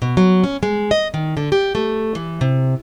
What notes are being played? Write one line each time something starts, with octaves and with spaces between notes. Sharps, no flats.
B2
F#3
C#4
G#3
D#5
D#3
D3
G4
A3
E3
C3